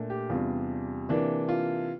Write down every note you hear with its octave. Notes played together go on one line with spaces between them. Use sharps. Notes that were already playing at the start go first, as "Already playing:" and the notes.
Already playing: A#2 A3 D4
G4
E2 C3 G3 D4 F4
C3 E3 A#3 D4
F4